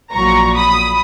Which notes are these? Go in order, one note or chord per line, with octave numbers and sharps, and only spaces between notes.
A#1 A#2 F#3 A#5 C#6
B5 D#6